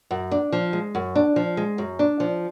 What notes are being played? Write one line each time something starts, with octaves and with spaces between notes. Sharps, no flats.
F#2
D4
F3
G#3
F#2
D4
F3
G#3
F#2
D4
F3